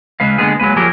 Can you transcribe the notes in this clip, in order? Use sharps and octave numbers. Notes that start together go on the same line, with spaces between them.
C#3 G#3 B4 F5
D3 G#3 A#3 B3 G#4
F#3 G#3 A#3 B4
F3 F#3 G4 G#4 A#4